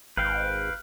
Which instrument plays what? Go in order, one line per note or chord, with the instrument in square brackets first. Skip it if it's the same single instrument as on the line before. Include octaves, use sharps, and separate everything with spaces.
[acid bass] G#1 [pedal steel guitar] B4 F5 G5